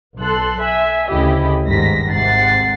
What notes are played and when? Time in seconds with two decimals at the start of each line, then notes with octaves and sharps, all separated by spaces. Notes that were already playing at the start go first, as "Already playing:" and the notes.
0.19 B1 A4 C6 F#6
0.61 E5 G#5
1.10 D2 C#3 E4 G4 D#5 B5
1.65 G1 G#2 D#3 G3 A#6 B6
2.11 G#1 G#2 C3 F#5 A6 C7